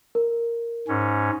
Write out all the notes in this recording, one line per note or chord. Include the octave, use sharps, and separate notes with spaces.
A#4
G#2 C#4